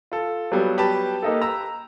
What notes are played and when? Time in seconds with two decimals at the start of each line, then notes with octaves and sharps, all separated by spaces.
0.12 F4 A4
0.52 F#3 G3 B3
0.78 G4 B4 A5
1.22 A#3 D#4 A4
1.42 A#5 E6